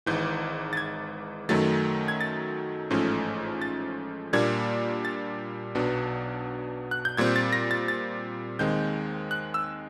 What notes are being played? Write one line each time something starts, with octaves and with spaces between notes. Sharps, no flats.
G#1 G#2 E3 G6
A6
G#6
F#2 D#3 F#3 A3 A6
G#6
A6
A1 G#2 F3 A3 C#4
A6
A#2 G3 A#3 D4 G#6
A6
B1 B2 F#3 B3 D4
F#6
G6
A#2 G3 C4 G#6
A6
A#6
A6
A6
D#2 D#3 G#3 C4 G6
F#6
E6